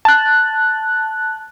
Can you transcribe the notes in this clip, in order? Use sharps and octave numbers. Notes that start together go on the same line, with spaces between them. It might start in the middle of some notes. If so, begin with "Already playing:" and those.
A5 F#6